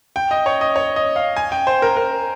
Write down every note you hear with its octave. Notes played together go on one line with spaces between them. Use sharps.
G5
D#5
C#5
D#5
C#5
D#5
F5
G#5
G5
C5
A#4
A#4